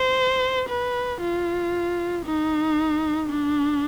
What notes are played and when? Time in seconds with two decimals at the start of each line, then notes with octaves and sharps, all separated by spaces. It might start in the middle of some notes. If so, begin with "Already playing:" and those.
Already playing: C5
0.69 B4
1.21 F4
2.25 D#4
3.30 D4